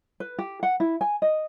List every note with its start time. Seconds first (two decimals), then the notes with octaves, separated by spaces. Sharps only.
0.20 B4
0.39 G4
0.63 F#5
0.80 E4
1.01 G#5
1.22 D#5